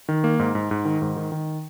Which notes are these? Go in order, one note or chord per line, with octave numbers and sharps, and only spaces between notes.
D#3
A#3
G#2
G#2
G#2
D#3
G#2
D#3
D#3